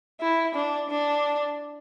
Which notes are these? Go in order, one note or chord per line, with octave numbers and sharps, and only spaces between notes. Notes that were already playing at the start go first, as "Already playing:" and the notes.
E4
D4
D4